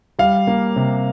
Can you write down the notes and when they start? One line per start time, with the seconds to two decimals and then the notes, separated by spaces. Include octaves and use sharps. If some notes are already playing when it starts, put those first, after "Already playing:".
0.19 G3 F5
0.47 A#3
0.76 C3